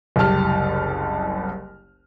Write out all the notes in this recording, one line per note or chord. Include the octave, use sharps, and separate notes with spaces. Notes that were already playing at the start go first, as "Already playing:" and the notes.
F#1 C2 G4 A5 F6